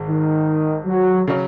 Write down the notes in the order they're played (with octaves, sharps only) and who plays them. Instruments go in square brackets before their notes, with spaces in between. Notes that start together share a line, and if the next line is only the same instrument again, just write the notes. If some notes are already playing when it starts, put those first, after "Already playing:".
Already playing: [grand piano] G#1 G#2 G#3
[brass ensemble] D#3
F#3
[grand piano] C#3 F#3 C#4